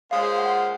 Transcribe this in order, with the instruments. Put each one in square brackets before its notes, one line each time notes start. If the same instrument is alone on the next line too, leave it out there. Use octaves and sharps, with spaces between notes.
[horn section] A#2 G#3 C#4 F4 C5 [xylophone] F5
[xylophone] F#5